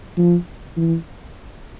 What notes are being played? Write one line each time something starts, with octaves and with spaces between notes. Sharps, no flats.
F3
E3